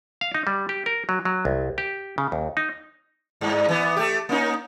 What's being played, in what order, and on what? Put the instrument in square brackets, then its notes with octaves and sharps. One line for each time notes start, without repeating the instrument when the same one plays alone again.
[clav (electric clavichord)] F5
D#4
G3
G4
A#4
F#3
F#3
C2
G4
C#3
D#2
D#4
[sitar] G2
E3 B3
A3 G4
A#3 C#4 D#4